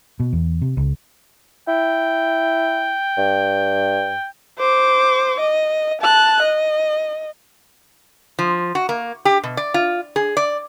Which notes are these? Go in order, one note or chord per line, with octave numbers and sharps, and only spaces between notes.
B2
E2
C3
C#2
E4 G5
G2
C5 D6
D#5
A5 F#6
D#5
F3
F#4
A#3
G4
B2
D5
F4
G#4
D5